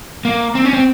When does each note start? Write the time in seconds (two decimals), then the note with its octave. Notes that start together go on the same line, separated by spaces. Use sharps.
0.25 A#3
0.55 C4
0.65 C#4
0.73 C4